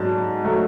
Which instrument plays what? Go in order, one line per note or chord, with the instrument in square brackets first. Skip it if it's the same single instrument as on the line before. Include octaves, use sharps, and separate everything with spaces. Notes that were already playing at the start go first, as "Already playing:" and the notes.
Already playing: [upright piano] G#2 F#3 A5
F#3 A3